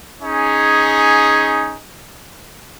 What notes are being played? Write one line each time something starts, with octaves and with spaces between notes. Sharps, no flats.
C#4 D#4 G#4